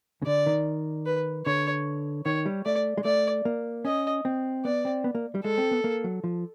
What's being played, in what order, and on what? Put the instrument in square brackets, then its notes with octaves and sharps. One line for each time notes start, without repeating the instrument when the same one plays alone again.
[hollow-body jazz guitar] C#3
[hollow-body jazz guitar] D3 [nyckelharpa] D5
[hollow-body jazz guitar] D#3
[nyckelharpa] B4
[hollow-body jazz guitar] D3 [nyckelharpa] C#5
[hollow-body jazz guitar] D#3 [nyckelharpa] C#5
[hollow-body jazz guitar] G3
[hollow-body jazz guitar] A3 [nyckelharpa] D5
[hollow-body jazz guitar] G#3
[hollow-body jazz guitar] A3 [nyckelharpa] D5
[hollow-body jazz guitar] A#3
[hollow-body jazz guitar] C#4 [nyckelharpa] D#5
[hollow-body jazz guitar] C4
[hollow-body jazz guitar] B3 [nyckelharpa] D5
[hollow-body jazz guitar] C4
B3
A#3
G3
[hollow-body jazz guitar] G#3 [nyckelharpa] A4
[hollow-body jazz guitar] C4
B3
A#3
F#3
F3